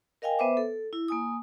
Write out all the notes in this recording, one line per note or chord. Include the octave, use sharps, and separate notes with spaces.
A#4 D#5 F5 G5 G#5
B3 B4 C5 E5 D6
A4
E4
A#3 G#5 D#6